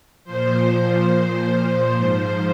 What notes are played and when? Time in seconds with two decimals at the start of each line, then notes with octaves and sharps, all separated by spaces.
0.24 A#2 F3 C5
0.67 C5
1.09 A#2 F3
1.52 C5
1.94 G#2 F3 C5